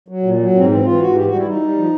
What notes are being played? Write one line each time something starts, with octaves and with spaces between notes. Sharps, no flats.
F#3
A#2
F#3
G#2 C4
E3 C4
E3 F4
G#2 F#4
E3 G4
G3 F#4
E4
G3 D#4
G3
F3